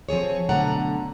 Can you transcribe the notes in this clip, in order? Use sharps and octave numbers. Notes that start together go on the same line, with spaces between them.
F3 C4 G#4 C#5
F#2 B2 D3 A3 F#5 A#5